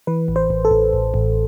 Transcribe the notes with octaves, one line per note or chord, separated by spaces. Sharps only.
E3 B4
A1
C5
A1
A4
A1
A1
A1